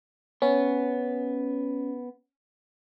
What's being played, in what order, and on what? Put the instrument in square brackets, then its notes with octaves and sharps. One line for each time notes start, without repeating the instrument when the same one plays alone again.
[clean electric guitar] B3 [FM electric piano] C#4